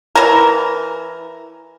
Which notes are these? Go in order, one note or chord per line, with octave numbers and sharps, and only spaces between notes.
E3 A#4